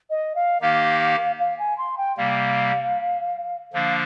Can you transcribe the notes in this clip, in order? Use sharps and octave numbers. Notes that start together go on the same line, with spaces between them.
D#5
F5
D#3 A#3 D#4 G4 F5
F5
G#5
C6
G5
C3 G3 A#3 F5
D3 F3 A#3 D4 F5